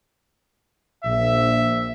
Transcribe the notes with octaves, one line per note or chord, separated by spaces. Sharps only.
A#1 E5